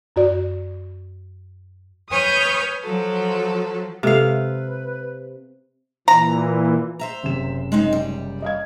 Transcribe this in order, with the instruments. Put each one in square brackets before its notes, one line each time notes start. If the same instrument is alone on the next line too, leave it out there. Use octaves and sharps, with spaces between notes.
[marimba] F#2 F#4 D5
[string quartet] B4 C#5 G#5 D#6 F6 G6
F3 F#3 A4
[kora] C3 F5 [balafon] G#3 A4 [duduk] B4
[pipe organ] A#2 E3 [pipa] A#5
[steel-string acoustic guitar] C5 E5 A#5
[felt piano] F#1 C3 E7
[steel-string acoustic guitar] G#3 C4 D#4
G3
[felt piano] D#5 F5 G#6